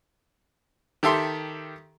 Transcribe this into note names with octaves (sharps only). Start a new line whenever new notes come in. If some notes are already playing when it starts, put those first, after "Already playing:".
D#3 G4 A4 E5 C6